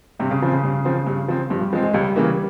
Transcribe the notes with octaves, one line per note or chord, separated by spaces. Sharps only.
G2 C3
C#3
C#3 F3 C4
C#3
G2
F3 C4
G2
F3 C4
G2 F3
G3
F3 G#3 C4
G#3
C#2 G3
C#3 E3 A#3